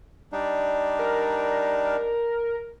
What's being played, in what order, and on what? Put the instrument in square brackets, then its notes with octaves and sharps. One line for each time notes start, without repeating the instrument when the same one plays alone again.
[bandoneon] G3 D4 D#4
[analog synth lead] A#4